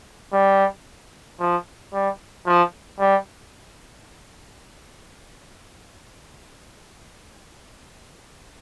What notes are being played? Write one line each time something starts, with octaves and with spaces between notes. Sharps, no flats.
G3
F3
G3
F3
G3